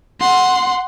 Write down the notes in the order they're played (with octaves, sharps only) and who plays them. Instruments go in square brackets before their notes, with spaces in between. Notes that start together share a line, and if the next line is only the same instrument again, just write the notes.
[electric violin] F#5 C6